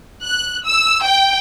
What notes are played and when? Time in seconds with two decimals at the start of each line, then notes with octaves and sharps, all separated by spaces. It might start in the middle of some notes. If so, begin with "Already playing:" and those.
0.22 F#6
0.65 E6
1.04 G5